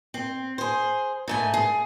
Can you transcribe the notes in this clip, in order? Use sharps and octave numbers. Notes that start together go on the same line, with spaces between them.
C4
G#4 C5
G#2 A3 G#5
G#4